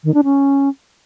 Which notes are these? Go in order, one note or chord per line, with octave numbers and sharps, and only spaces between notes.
D#3
D4
C#4